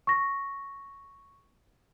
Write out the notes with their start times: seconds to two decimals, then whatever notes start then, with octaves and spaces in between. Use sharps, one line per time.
0.07 C#6 A#6